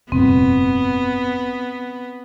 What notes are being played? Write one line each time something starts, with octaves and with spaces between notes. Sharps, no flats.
F1 G2 A#2 B3 C4